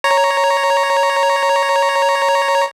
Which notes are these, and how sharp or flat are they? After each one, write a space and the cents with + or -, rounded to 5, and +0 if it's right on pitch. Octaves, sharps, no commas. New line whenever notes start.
C#5 +0 A#5 +0